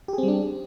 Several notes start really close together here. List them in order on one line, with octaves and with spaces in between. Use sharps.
G4 G#4 C4 G3 D4